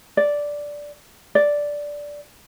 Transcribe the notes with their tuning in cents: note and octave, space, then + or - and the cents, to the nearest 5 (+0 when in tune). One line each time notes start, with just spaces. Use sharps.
D5 -5
D5 -5